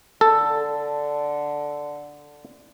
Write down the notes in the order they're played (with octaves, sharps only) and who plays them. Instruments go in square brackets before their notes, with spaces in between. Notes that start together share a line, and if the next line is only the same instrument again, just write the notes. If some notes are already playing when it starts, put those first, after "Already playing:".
[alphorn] D3 [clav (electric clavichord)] A4